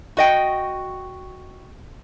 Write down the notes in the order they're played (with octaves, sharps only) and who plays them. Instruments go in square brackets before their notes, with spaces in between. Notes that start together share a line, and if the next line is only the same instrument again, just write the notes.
[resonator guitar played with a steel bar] F#4 D#5 G5